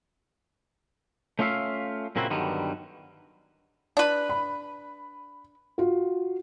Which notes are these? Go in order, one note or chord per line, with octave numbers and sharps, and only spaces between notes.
A3 C#4 F4 C#5 E5 F5
A#2 C#3 A#3 C4 E4 F#4
G2 D3 D#3 F#3 G3 B3
D4 B4
B5
F4 F#4